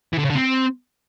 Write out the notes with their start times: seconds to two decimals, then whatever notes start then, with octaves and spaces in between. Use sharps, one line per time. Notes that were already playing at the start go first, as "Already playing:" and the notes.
0.13 E3
0.19 D3
0.24 C#3
0.30 D3
0.35 C4